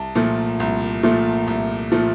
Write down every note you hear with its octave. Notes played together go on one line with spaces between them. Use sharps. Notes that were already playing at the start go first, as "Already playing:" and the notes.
Already playing: C2 A5
A#2 F3 A3
C2
A#2 F3 A3
C2
A#2 F3 A3